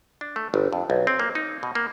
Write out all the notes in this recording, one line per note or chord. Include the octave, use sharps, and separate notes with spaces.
D4
A3
G1
F2
B1
C4
A#3
D#4
B2
A#3